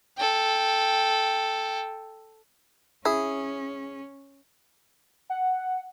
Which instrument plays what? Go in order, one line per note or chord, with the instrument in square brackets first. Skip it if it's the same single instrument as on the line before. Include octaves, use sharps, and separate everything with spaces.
[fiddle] A4 G5
[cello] C#4 [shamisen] E4 [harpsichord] G#4
[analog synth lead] F#5